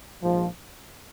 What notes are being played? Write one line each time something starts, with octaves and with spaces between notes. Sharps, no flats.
A#1 G#2 F3